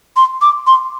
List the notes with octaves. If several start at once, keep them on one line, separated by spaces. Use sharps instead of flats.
C6
D6
C6